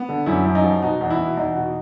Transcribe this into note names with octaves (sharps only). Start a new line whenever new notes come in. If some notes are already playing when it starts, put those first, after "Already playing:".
Already playing: B3
D3
F#2 E4
F#2
D#4
F3
B2 D#4
E2
E4
B2
E2 D#4
B2